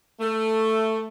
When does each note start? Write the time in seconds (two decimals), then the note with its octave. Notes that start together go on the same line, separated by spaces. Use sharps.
0.20 A3